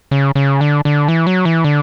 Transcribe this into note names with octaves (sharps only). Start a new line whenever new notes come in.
C#3
C#3
D3
D3
E3
F#3
E3
D3